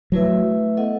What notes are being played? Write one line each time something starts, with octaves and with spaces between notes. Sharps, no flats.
F#3 A3 E4 B4 E5
B3 E4 A4 D#5 F#5